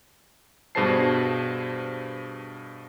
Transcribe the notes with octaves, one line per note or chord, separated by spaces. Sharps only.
G2 B2 G#4 C5 A5 C7